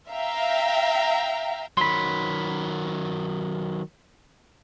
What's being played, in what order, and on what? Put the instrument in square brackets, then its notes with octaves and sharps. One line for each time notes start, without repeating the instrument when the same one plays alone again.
[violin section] E5 F5 G5 A#5
[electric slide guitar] D#3 F#3 [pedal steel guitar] B5 C6